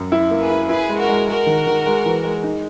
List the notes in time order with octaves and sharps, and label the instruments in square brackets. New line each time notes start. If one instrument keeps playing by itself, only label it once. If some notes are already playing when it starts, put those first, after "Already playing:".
Already playing: [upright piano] F#2
E4
A#3
[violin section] G#4 B4
[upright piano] E4
[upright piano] E4 [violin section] G#4 B4
[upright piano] G#3
[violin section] F#4 A#4
[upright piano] G#3
[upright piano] G#3 [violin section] F#4 A#4
[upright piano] D#3
D#3
G#3
E3
G#3
D#4